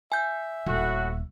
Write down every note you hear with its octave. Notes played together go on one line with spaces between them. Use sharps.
E5 G#5 G6
D#1 A2 F#4